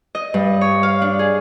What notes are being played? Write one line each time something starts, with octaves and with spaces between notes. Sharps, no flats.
D#5
G2
C#5
F5
D4
G#4